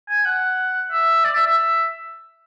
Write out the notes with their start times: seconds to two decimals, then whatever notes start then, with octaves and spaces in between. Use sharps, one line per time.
0.09 G#5
0.25 F#5
0.91 E5
1.24 D5
1.35 E5
1.46 E5